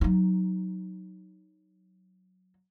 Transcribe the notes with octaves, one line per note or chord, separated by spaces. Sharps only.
F#3 D#4